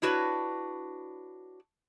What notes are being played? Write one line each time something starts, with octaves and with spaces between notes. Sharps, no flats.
D4 E4 F#4 B4 C#5